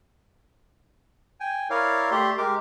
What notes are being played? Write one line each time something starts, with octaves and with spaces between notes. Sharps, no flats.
G5 G#5
E4 A#4 C#5 D5 F5
A3 G4 D5 E5 C6
G#3 G4 A#4 D6